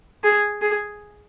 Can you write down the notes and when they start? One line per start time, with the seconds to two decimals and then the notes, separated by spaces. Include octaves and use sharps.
0.24 G#4
0.61 G#4